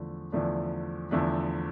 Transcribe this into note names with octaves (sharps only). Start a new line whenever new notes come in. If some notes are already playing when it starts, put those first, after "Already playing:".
Already playing: E2 D3 F3 A3
E2 D3 F3 A3 D4
E2 D3 F3 A3 D4